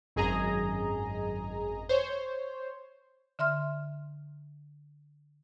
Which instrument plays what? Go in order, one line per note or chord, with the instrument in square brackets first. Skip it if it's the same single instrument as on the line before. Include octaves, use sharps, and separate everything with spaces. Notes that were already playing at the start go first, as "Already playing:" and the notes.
[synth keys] G#1 F#2 G#4 D#5 G#5 A#5
C5 C#5
[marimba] D3 E5 C6 F6